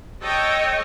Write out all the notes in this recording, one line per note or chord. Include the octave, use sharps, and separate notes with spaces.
A4 C#5 D#5 G5